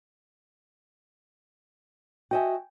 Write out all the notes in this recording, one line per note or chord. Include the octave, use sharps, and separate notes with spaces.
F#4 D#5 E5 G5 G#5